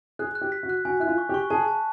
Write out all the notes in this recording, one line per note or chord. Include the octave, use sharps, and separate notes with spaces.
G#4 F#6
F#6
G4
B6
F#4
F#6
F#4 G#5
E4 F#6
F4
C#6
G4
C#6
G#4 A5
A5